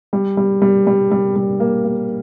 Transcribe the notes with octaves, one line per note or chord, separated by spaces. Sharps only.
G3
G3
G3
G3
G3
G3
A#3
A#3